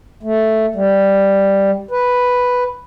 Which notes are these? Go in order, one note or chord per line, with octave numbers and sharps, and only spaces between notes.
A3
G3
B4